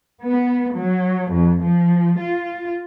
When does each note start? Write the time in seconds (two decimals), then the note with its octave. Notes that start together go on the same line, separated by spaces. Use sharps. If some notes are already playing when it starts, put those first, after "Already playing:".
0.23 B3
0.74 F#3
1.31 F2
1.62 F3
2.19 F4